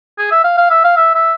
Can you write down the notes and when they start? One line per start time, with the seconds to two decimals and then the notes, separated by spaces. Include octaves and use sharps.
0.18 G#4
0.31 E5
0.44 F5
0.58 F5
0.70 E5
0.84 F5
0.96 E5
1.15 E5